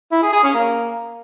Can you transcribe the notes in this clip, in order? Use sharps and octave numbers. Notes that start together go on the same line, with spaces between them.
E4
G#4
G#4
C#4
A#3